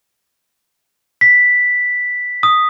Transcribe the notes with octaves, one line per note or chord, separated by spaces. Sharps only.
B6
D#6